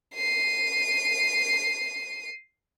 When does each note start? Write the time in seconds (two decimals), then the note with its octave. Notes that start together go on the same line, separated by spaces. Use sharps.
0.15 C7 D#7